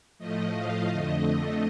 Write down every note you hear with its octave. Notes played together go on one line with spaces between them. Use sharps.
A2 F3 A3 D#5
F5
F2 D3 A3 D#5